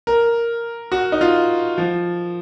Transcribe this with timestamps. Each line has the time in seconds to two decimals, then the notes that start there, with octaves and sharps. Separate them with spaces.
0.07 A#4
0.92 F#4
1.12 D#4
1.21 F4
1.78 F3